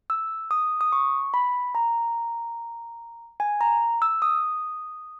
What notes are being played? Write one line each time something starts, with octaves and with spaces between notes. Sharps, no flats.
E6
D#6
D#6
C#6
B5
A#5
G#5
A#5
E6
D#6